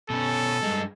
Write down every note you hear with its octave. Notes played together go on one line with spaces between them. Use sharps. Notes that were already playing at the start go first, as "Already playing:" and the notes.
B2 C#4 A4
G2 G#3